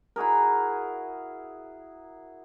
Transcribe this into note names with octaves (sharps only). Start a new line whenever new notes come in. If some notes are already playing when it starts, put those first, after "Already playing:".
E4 F#4 G#4 A#4